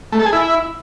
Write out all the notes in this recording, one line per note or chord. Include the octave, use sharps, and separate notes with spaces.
A3
A4
G#4
E4